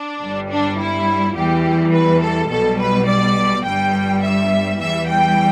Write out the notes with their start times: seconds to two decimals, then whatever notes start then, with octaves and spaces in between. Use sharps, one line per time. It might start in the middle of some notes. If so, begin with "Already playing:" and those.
Already playing: D4
0.21 G1 G2 G3
0.50 D4
0.79 E4
1.36 E2 E3 G3 G4
1.94 B4
2.22 A4
2.50 B1 B2 G3 A4
2.79 B4
3.07 D5
3.65 G1 G2 G3 G5
4.22 E5
4.80 E2 E3 G3 E5
5.08 G5